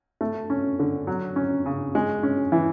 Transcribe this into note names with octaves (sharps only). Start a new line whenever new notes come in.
A3
C#4
D3
F#3
C#4
C#3
G#3
C#4
E3